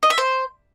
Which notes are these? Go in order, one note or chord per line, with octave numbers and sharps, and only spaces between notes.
D#5
E5
C5